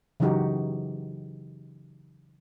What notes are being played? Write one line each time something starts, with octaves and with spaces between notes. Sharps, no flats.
C#3 E3 F#3 D#4 F#4 G4